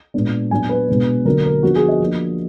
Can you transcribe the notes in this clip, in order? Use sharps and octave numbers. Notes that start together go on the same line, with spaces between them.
A#2 G#3 B3 D4
A#2 F#3 B3 D4 G#5
B4
B2 G#3 B3 D4
D3 F#3 A#3 D4 A#4
A#4
F3 B3 D4 F#4
G#4
D#5
F3 A#3 D4